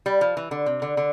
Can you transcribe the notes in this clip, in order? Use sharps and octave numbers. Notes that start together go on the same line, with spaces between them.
G3
F3
E3
D3
C3
D3
D3